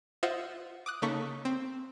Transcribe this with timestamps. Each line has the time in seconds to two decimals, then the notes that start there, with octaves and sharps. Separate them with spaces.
0.23 F4 C5 D#5 E5 F#5
0.86 D6 D#6 F#6
1.02 C#3 A#3 D#4 A4 C#6 B6
1.45 C4